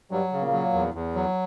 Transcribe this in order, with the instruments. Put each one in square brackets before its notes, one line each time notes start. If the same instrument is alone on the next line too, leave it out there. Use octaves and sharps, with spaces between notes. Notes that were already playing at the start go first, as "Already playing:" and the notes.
[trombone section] G2 G3 [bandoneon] F#3
[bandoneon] C#3
[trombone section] A#2 A#3
[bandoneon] F#3
E2
E2
F#3